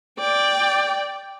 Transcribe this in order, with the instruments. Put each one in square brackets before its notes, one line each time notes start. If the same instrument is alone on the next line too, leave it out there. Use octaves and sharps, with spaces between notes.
[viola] D5 G5